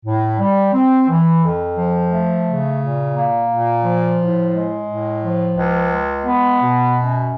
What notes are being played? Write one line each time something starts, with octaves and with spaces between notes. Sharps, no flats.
A2
G3
C4
E3
F2
F3
A3
C#3
A#2
A#3
A#2
F3
A2
G#3
A2
F3
C#2
G#3
B3
B2
F#2